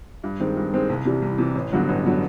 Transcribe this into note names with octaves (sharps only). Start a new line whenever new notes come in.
G2
D#3 G#3 C4
G2
D#3 G#3 C4
C2
C3 E3 G3
C2
C3 E3 G3
A1
G2 D3 F#3 B3
A1
D3 F#3 B3